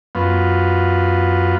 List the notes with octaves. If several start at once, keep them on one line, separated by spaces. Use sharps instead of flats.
F#2 B3 F4